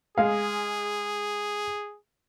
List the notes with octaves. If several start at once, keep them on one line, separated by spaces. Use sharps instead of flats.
G#3 G#4 F5